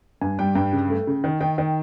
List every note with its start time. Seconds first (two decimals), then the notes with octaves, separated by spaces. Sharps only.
0.21 G2 G#5
0.39 G3 G5
0.55 G2 G5
0.73 C#3
0.90 A3
1.07 C#3
1.24 D#3
1.40 D#3 G5
1.58 D#3 G5